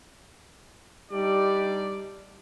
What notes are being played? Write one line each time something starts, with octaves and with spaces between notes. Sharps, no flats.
G3 D4 D#4 D5